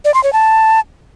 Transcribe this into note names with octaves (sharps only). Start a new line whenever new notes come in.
D5
C6
C#5
A5